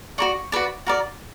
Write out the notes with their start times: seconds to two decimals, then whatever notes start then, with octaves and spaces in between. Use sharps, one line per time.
0.18 F#4 A#4 D5 C#6
0.52 F#4 B4 D5
0.87 F#4 A#4 D5